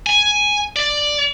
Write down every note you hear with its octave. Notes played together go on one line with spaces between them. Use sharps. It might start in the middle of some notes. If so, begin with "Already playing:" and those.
G#5
D5